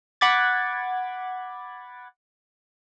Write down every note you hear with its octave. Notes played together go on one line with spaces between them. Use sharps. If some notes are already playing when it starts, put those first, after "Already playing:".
F#5 B5 D6 G#6 A6